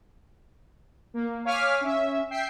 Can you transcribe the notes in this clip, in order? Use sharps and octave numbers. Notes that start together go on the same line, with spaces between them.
A#3
C#5 F5 G#5 D6 F6 B6
C#4 E5
E5 G5 C7